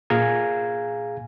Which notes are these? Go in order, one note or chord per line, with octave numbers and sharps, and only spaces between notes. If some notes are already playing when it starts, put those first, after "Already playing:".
A#2 G#4 F5 G#5 A#5 G#6